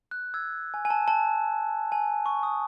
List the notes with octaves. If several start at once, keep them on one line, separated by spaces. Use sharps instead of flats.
F#6
E6 G#6
G#5
G#5
A5
A5
G#5
C#6
D#6